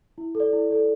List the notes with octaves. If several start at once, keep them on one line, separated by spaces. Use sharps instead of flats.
E4
A4
D5
E4
A4 D5